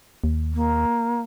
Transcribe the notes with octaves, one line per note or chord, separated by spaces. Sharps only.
D#2
A#3